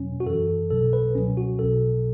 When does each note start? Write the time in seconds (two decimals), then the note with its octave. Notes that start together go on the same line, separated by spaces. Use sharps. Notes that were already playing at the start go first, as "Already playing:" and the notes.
Already playing: E2 B2 F#3 C#4
0.20 F#4
0.26 F#2 E3 A4
0.70 B1 B2 F#3 A4
0.93 B4
1.15 C#2 B2 F#3 C#4
1.37 F#4
1.59 B1 B2 F#3 A4